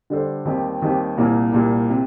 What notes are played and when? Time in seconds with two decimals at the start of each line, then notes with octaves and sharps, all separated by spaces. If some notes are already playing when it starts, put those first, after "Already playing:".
0.10 D3 G3 D4 A4 C5
0.45 D#2 D#3 G3 C4 G4
0.82 D#2 D#3 G3 C4 G4
1.17 C2 A#2 G3 A#3
1.53 C2 A#2 G3 A#3
1.90 C3